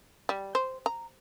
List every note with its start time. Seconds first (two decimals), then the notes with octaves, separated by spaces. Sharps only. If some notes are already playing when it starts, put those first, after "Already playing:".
0.29 G3
0.55 C5
0.86 A#5